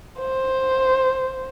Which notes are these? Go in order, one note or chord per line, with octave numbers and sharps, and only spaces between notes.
C5